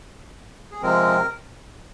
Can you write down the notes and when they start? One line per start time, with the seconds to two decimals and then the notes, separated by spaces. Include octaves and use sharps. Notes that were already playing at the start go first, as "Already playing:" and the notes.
0.71 G#4
0.82 C3 F3 G#3 C4 A#4